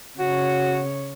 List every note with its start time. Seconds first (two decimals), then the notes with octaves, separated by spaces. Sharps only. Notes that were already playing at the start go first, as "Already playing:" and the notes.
0.19 C#3 F#4 C#5